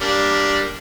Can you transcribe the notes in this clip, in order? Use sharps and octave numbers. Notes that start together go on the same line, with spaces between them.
G3 A#3 D4